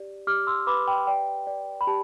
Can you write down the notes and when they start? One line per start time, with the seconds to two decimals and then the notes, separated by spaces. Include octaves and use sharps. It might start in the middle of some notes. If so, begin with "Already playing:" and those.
Already playing: G4 D5
0.27 G4 D6 F6
0.47 C6 E6
0.67 B4 B5 D6
0.87 G5 B5
1.07 D5 G5
1.47 D5
1.81 B5
1.87 G4 A5